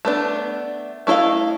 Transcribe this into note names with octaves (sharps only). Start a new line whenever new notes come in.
A3 B3 D4
A3 E4 A4 D#5 F5